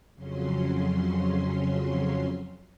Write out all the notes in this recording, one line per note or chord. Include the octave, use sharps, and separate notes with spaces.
F2 C#3 F#3 C#4 C6